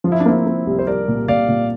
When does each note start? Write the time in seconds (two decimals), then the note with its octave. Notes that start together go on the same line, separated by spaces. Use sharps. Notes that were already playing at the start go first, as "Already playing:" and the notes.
0.04 F3 F4
0.12 E4
0.20 D4
0.26 A#3 C4 E4
0.46 A#3
0.67 C2
0.79 C5
0.87 C2 A#4 D5
1.08 A#2
1.28 A#2 D5 F5
1.48 A#2